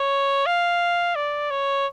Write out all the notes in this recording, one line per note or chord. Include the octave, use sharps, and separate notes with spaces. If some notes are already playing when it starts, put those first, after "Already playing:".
Already playing: C#5
F5
D5
C#5